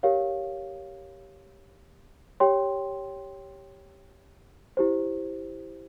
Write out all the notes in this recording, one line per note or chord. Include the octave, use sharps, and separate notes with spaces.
G4 A#4 C#5 F5
G4 C#5 G5 C6
E4 G4 C5